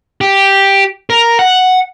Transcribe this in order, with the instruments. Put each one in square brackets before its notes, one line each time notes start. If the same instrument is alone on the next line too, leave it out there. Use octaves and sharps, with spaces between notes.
[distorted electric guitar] G4
A#4
F#5